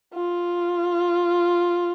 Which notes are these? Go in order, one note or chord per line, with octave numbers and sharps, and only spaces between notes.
F4